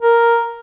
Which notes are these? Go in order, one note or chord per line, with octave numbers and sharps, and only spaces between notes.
A#4